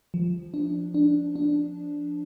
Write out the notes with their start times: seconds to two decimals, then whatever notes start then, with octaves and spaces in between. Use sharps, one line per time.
0.14 F3
0.54 D4
0.94 D4
1.36 D4